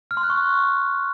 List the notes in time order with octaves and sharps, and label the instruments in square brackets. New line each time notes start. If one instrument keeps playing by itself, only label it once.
[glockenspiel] F6
C6
F#6
C#6